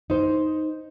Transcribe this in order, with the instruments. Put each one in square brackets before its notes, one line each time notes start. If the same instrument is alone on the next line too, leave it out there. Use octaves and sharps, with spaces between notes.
[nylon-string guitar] D#4 C5